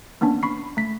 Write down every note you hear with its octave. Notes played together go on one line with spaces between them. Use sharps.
A#3 B3 C#4 D4
B5 C#6 C7
A3 B6